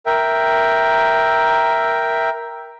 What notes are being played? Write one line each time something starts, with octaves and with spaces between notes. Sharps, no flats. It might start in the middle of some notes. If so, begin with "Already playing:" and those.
A#4 E5 G5